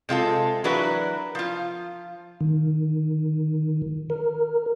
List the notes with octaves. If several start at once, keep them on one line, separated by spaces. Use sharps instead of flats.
C3 G#3 F4 A4
E3 F#3 D4 F#4 A#4 B4
F3 F4
D#3
A#4